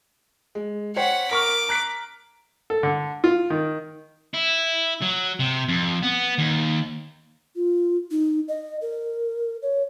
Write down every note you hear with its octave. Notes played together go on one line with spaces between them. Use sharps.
G#3
C5 C#5 F#5 G5 B6
A#4 C#6 D6 F6
A#5 F#6 B6
A4
D3
F4
D#3
E4
F#3
C3
F2
B3
D#2
F4
D#4
D#5
A#4
C#5